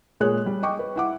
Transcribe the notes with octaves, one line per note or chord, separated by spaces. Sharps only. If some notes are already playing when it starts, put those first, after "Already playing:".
A#2 G#3 G#4 C#5 F#6
G3
D#5 G5 C#6 D6
B4
E4 F#5 D6